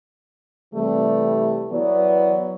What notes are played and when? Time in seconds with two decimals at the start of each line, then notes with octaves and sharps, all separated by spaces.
0.74 C3 E3 G3 A3
1.71 E3 F#3 B3 D5